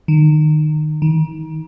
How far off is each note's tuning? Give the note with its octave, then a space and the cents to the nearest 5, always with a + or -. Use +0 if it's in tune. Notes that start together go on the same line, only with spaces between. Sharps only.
D#3 -25
D#3 +30